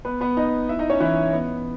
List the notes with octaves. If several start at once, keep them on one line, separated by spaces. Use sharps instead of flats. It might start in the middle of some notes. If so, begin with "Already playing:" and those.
B3 B4
B3 B4
D#4 D#5
E4 E5
D#4 D#5
C#4 C#5
E3 E4
B3